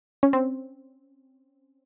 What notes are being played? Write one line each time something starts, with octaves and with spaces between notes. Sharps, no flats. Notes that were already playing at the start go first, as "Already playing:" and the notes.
C#4
C4